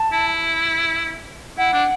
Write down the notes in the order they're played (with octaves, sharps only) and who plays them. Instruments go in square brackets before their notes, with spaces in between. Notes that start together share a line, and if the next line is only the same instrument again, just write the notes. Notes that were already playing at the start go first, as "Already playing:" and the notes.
Already playing: [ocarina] A5
[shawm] E4
[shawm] E4 [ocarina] F#5
[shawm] D4